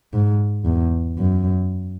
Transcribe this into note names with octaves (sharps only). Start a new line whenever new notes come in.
G#2
E2
F#2